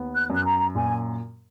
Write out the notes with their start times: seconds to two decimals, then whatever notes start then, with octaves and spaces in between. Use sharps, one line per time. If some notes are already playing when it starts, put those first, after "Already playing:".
Already playing: D#2 B3
0.15 F#6
0.30 F#2 F#6
0.45 A#5
0.75 A#2 G#5